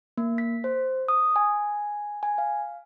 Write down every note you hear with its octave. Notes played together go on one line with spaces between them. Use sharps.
A#3
B6
C5
D#6
G#5
G#5
F5